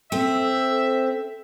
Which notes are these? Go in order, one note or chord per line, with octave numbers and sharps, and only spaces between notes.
C4 A4 E5